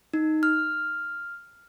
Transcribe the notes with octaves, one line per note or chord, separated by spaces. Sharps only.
D#4
F6